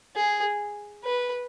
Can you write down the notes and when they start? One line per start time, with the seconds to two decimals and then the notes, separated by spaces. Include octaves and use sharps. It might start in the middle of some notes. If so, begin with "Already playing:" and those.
0.16 G#4
1.04 B4